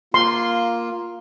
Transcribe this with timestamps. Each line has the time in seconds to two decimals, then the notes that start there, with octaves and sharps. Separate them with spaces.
0.14 A#3 F4 C6